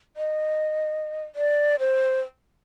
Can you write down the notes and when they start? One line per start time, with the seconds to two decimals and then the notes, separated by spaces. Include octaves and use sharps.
0.17 D#5
1.35 D5
1.80 C5